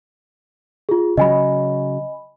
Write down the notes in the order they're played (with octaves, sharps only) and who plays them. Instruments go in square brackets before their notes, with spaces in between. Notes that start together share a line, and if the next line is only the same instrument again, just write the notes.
[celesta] F4 G#4
[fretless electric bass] C#3 F#3 [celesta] D#5 G#5 B5